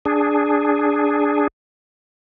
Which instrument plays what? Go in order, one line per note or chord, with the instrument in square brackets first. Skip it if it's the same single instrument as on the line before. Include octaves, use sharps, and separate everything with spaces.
[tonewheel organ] D4 G#4